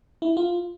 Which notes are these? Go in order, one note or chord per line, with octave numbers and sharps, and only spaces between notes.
E4
F4